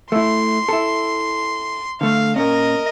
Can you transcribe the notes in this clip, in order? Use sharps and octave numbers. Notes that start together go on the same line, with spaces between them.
A3 E4 C6
E4 A4
D3 A3 F5
A#2 C#4 A#4 D#5